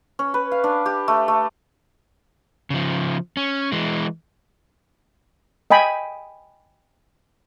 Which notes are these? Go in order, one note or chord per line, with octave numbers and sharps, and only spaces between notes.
C#4
B4
F5
D4
G4
A3
A3
C#3 F3
C#4
E3 G#3
D#5 G5 G#5 B5